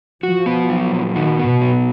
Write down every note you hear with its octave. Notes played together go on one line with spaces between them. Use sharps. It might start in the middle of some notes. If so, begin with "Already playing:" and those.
F3 F#4
B3
F#3
A#2
D#3 F#4
B3
B2
F#3